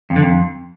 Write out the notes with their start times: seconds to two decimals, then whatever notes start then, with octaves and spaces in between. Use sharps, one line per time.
0.10 F2
0.16 D3
0.22 F2